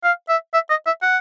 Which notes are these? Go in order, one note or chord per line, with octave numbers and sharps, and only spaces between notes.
F5
E5
E5
D#5
E5
F#5